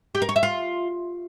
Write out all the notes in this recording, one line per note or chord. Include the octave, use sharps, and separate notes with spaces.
G4
A#4
C#5
E5
F4